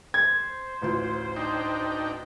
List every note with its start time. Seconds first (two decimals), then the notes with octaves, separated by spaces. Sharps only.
0.14 C5 G#6
0.82 A1 D2 F4
1.36 D4 D#4 G5